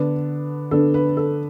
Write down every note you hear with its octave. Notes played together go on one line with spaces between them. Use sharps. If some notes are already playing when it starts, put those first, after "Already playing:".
Already playing: D3 B3 D4
D3 B3 D4 A4
B4
A4